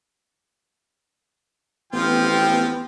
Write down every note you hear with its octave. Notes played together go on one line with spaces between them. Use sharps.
A1 F3 B3 C4 F4 G4 G5